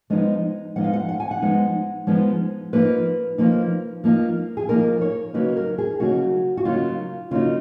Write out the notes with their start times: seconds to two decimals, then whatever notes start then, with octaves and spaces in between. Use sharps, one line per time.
0.10 F3 G#3 B3 D#4 D#5
0.76 F3 G#3 B3 D#4 F#5
0.84 F5
0.93 F#5
1.09 F#5
1.20 G#5
1.31 F#5
1.42 F3 G#3 B3 D#4
2.07 F3 G#3 B3 D#4
2.73 F3 A#3 D#4 B4
3.38 F3 A#3 D#4
4.04 F3 A#3 D#4
4.57 G#4
4.69 F3 A#3 D#4 A#4
5.01 C#5
5.34 C#3 F#3 A#3 D#4 B4
5.57 A#4
5.78 G#4
6.00 C#3 F#3 A#3 D#4 F#4
6.57 F#4
6.65 C#3 F#3 A#3 D#4 F4
7.31 C#3 F#3 A#3 D#4 F4